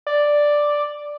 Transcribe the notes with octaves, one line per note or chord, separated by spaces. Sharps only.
D5